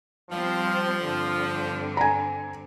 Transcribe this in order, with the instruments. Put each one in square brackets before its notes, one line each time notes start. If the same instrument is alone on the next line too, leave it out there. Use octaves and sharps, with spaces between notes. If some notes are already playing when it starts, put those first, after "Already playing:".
[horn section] F3 [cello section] G3 C4
[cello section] G2 D3 C4
[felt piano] G#5 A#5